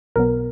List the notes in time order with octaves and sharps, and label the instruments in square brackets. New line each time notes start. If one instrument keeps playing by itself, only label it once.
[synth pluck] B1 B2 F#3 B3 A#4